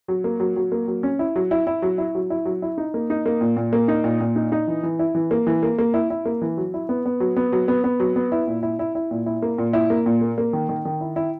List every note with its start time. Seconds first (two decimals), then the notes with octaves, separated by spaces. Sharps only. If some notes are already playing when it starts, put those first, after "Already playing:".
0.08 F#3
0.24 A#3
0.40 F#3
0.56 F#3
0.72 A#3
0.88 F#3
1.03 C#4
1.19 E4
1.36 F#3
1.51 E4
1.67 E4
1.82 F#3
1.98 E4
2.15 F#3
2.30 E4
2.45 F#3
2.62 E4
2.78 D#4
2.94 A#3
3.10 D#4
3.26 A#3
3.41 A#2
3.57 A#2
3.73 A#3
3.88 D#4
4.04 A#2
4.20 A#2
4.36 D#4
4.52 D#4
4.68 E3
4.83 E3
4.99 E4
5.15 E3
5.31 A#3
5.47 E3
5.63 A#3
5.79 A#3
5.94 E4
6.10 E4
6.25 A#3
6.42 E3
6.57 F#3
6.74 E4
6.89 B3
7.06 B3
7.20 F#3
7.37 B3
7.52 F#3
7.68 B3
7.84 B3
8.00 F#3
8.16 B3
8.32 E4
8.47 A#2
8.63 E4
8.79 E4
8.95 E4
9.11 A#2
9.26 E4
9.42 A#3
9.58 A#2
9.73 E4
9.90 A#3
10.06 A#2
10.21 A#3
10.38 A#3
10.53 D#3
10.69 D#3
10.85 D#3
11.01 E4
11.16 E4